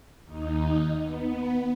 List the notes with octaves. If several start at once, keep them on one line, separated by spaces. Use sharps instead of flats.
D#2 D#4
B3